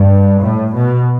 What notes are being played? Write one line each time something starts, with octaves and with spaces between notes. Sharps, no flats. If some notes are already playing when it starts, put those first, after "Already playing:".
Already playing: G2
A2
B2